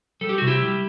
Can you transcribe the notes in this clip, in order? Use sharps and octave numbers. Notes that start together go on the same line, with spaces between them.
G3 A4
G4
C3 F#4
E4 G4
G3